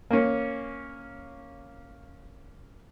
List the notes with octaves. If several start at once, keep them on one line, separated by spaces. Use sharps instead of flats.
A#3 C#4